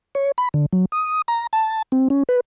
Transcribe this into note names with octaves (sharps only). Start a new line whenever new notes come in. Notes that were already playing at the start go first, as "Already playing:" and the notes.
C#5
B5
D3
F#3
D#6
A#5
A5
C4
C#4
B4